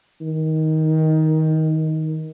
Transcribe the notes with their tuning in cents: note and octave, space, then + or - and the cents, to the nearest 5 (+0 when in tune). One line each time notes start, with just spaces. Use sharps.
D#3 +15